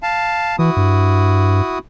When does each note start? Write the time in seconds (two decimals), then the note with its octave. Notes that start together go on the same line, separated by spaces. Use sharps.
0.03 F5 A5
0.59 E3 E4 F#4 D#6
0.77 G2